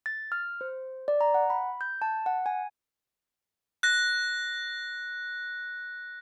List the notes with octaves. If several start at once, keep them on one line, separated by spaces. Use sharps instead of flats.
A6
F6
C5
D5
A#5
F#5
B5
G6
A5
F#5
G#5
F#6 A#6